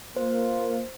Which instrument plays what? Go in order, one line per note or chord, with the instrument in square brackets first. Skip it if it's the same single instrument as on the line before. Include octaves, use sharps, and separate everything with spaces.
[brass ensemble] A#3 F4 [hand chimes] C5